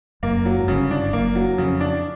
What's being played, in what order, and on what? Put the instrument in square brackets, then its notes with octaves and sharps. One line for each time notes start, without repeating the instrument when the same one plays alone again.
[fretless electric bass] F#1 F#2 [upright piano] A#3
[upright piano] F#3
[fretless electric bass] G#2
[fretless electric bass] G1 G2 [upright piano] C#3
[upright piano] D4
[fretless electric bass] F#1 F#2 [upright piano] A#3
[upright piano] F#3
[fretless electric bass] F2 [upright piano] C#3
[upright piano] D4